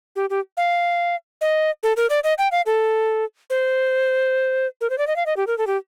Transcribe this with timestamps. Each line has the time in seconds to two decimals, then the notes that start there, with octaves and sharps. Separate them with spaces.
0.16 G4
0.30 G4
0.57 F5
1.41 D#5
1.83 A4
1.96 A#4
2.10 D5
2.24 D#5
2.38 G5
2.52 F5
2.66 A4
3.50 C5
4.81 A#4
4.90 C5
4.98 D5
5.07 D#5
5.16 F5
5.26 D#5
5.37 G4
5.47 A#4
5.58 A4
5.67 G4